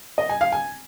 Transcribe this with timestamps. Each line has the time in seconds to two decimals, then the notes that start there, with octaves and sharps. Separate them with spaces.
0.18 D#5
0.29 G#5
0.41 F5
0.52 G#5